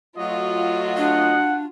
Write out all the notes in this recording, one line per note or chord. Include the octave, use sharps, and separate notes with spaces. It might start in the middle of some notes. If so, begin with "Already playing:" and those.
F#3 A3 F4 F#4 D#5
D4 F#5